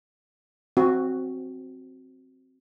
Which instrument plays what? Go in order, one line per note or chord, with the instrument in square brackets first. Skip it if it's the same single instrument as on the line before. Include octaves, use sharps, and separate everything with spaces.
[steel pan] C4 F#4